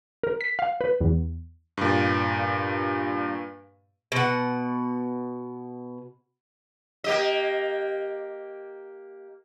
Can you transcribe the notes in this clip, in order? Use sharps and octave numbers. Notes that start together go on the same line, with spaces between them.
A#4
B6
F5
B4
E2
G2 A#2
B2 F#5
A#3 G4 D#5